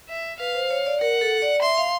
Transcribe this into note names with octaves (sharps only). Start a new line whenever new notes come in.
E5
B4 F5
C5
C#5
D5
A#4 F#5
A4
D5
E5 C6
F5